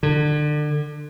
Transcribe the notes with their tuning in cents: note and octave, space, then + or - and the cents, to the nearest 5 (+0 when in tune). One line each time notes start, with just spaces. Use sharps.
D3 +30